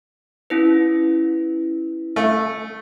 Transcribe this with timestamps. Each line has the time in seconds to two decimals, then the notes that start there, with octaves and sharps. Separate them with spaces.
0.50 C#4 E4 B4
2.16 A3